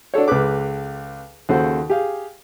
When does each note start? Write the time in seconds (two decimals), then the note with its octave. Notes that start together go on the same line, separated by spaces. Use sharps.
0.14 D4 F#4 A4 C#5
0.28 C#2 G#3 A4 B4 D6
1.49 D#2 C#3 F#4 A4 C5 F#5
1.90 G4 G#4 F5